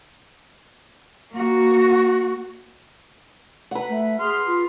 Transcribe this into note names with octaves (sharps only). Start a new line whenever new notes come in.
A#3 F#4
B4 F#5
A3
G#4 C6 F6
F4